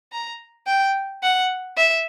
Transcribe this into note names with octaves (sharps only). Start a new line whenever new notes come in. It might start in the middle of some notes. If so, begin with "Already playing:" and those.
A#5
G5
F#5
E5